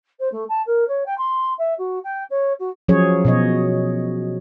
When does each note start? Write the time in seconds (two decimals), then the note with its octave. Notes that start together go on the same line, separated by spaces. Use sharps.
0.19 C5
0.32 A3
0.48 A5
0.66 A#4
0.87 C#5
1.05 G5
1.17 C6
1.58 E5
1.78 F#4
2.03 G5
2.30 C#5
2.59 F#4
2.88 F3 F#3 C#4 G#4 C#5
3.25 B2 C#5 D#5